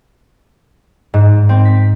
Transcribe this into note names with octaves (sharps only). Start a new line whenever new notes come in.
G#2
C4
B6